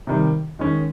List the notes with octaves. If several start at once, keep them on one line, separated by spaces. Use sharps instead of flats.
C3 D#3 G3
D#3 G#3 C#4